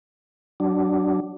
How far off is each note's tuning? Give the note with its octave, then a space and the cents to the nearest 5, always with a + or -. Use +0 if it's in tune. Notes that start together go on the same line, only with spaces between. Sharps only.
F#3 +20 D4 +0